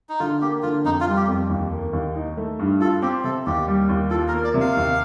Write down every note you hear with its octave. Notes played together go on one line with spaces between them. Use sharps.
D#4
D3 F4
A#3 G4
D3 F4
F2 D#4
F4
G3
G4
F2
D#2
A#3
D#2
D#4
A3
G2
F4 A4
C4 G4
C3 A4
D#2 G4
G3
D#2
F4 A4
A#4
A#3
D5
C3
F5
D#2